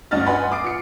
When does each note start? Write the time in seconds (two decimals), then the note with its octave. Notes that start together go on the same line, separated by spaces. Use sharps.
0.11 D2 G2 C#4 D#5 F6 A6
0.26 B4 D#5 F#5 G#5 B5 C6
0.52 D6 D#6 C7 D7
0.64 F4 C7 C#7